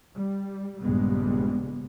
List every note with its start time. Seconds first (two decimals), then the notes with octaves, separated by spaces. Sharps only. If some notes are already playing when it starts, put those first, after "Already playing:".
0.15 G3
0.82 A#1 G2 C#3 G3 G#3 B3